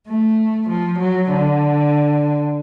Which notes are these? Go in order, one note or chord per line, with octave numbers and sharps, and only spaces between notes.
A3
F3
F#3
D3